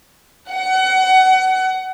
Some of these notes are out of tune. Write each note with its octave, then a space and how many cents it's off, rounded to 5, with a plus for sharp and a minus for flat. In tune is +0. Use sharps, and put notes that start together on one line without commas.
F#5 +25